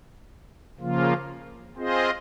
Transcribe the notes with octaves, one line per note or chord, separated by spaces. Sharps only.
C#3 F3 A#3 F4
C4 F4 G#4 C5 D#5